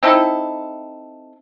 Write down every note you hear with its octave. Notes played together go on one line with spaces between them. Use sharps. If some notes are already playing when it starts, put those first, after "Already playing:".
C4 D#4 E4 A4